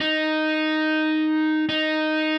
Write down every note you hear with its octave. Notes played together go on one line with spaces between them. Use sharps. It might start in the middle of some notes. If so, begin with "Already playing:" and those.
D#4
D#4